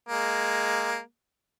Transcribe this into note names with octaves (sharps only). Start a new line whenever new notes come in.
G#3 A#3